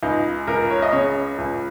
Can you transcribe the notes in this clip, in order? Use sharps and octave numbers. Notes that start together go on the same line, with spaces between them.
C#2 D#4
C#2 A#4
C#5
D#5
C#3 C#5
C#2